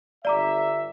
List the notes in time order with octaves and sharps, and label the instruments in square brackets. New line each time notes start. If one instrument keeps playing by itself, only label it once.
[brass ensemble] G1 E5 [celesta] D5 A#5 D6